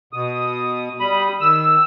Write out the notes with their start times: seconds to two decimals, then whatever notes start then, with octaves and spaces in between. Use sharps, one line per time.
0.13 B2 D#6
1.00 G3 B5 D#6
1.40 D#3 E6